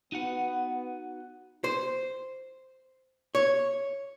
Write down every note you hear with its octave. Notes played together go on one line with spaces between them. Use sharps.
B3 D#4 F#4 F#5
C5
C#5